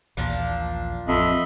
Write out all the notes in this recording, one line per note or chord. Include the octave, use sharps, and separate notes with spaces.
A#1 D#2 A#2 E3 F3 D4
A1 F2 D#5 E5 B5